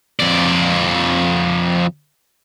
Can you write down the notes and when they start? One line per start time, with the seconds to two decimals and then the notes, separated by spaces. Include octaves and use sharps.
0.20 F2 D5